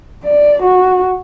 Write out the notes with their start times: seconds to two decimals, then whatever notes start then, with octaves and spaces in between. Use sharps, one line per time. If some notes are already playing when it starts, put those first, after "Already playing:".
0.25 D5
0.63 F#4